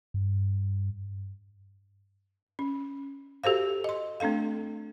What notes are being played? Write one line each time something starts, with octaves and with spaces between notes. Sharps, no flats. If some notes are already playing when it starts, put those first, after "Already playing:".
G2
C#4
F#4 G4 A4 C5 F5
D#5 C6
A3 C4 D4 A4 F5